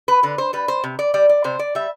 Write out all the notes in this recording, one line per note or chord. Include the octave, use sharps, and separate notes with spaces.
B4
D3 B4
C5
G3 B4
C5
C3
D5
G3 D5
D5
C3 C5
D5
G3 E5